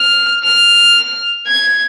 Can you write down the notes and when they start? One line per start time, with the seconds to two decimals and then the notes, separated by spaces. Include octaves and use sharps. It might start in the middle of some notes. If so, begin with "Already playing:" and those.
Already playing: F6
0.44 F6
1.46 G#6